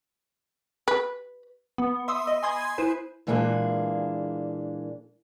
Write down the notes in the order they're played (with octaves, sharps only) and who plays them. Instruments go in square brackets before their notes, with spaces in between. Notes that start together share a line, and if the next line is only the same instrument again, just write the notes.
[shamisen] B4
[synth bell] B3
E5 C6 D#6 E6
D#5
G#5 B5 C6 D#6 G#6
E4 B4 C5
[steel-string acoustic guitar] A#2 E3 G#3 A#3 D4 G#4